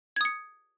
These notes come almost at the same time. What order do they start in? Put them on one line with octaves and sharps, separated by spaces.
G#6 D#6 C#7